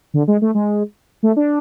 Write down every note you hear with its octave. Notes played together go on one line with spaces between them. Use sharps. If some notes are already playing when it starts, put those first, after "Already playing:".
D3
G#3
A3
G#3
A3
D4